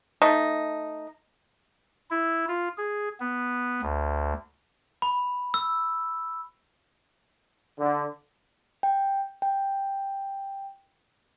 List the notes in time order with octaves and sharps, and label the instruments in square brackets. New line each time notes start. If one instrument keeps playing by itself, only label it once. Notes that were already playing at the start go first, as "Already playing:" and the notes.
[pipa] A3 D#4
[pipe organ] E4
F4
G#4
B3
D2
[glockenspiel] B5
E6
[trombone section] D3
[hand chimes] G5
G5